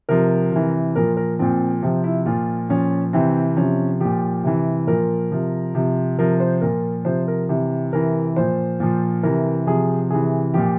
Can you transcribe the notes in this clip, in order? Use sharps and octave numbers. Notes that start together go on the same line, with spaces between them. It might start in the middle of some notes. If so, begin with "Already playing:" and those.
C3 F3 A#4
C3 E3
A#2 F3 A#4
A#4
A#2 F3 C4
C3 F3 C4
E4
A#2 F3 F4
A#2 F3 C#4
C3 E3 C4
C3 F3 C#4
A#2 F3 G4
C3 E3
A#2 F3 A#4
C3 F3
C3 F3
C3 F3 A#4
C5
A#2 F3 A#4
C3 F3 C5
A#4
C3 E3
C3 E3 A#4
A#2 F3 C5
A#2 F3
C3 E3 A#4
C3 F3 G#4
C3 E3 G#4
A#2 F3 G4